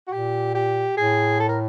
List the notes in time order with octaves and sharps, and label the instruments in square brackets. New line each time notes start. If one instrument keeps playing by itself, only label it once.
[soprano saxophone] F#4
[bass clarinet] A#2 [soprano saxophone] G4
[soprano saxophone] G4
[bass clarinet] A2 [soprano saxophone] G#4
[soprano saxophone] A4
A#4